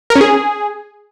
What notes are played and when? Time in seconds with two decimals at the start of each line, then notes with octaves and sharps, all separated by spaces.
0.10 A#4
0.15 C#4
0.21 G#4